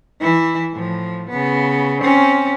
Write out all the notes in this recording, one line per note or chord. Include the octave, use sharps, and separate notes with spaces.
E3 E4
A2 F3
C#3 B3
C4 C#4